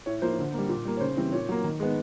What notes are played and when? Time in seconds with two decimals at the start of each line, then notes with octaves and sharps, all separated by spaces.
0.06 A2 C#5
0.22 F3 A#3 C5
0.39 D3
0.54 G3 A#3
0.69 A#2
0.85 G3 A#3
0.97 C#5
1.01 C#3 C5
1.17 E3 G3 C4
1.32 A#2 C#5
1.49 F#3 A#3
1.64 D#3
1.80 G#3 B3